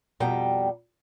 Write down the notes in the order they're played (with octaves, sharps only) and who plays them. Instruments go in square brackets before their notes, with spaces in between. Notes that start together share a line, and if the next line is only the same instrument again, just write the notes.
[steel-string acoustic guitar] F2 B2 G3 G5 A#5